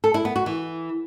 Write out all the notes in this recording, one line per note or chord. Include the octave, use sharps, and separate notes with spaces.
A4
E4
B3
F#4
E3